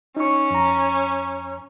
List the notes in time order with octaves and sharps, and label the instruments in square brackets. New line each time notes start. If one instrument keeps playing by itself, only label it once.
[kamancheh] C#4 [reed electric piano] D#4 C#6
[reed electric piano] F2 A#5